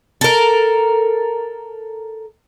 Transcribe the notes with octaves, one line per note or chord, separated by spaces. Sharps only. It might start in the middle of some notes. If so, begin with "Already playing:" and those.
A4 A#4